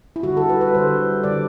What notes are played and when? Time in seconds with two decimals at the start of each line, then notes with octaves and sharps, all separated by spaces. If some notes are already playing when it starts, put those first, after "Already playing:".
0.16 E4
0.23 D3 G3 F#4
0.37 A4
0.50 B4
0.61 B4
0.74 D3 G3 C5
1.23 D3 G3 D5